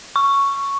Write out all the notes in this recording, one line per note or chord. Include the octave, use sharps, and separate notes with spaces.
C#6